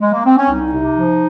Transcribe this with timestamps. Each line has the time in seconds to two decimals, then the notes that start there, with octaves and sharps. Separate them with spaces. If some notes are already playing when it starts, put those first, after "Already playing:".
0.00 G#3
0.12 A#3
0.25 C4
0.38 C#4
0.50 C2 D#4
0.72 C3
0.96 F3